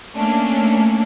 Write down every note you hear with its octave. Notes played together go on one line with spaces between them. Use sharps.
A3 A#3 C#4 D4